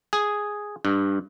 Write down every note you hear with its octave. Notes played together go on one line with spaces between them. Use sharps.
G#4
G2